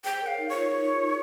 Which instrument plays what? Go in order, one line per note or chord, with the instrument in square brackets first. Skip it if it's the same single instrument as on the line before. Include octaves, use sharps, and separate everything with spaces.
[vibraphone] G#4 C5 [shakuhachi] G5
[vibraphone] A#4 C#5
[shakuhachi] F5
[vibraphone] D#4
[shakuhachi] C#5
[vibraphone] F4
D#4
F4